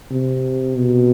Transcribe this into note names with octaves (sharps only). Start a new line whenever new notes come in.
C3
B2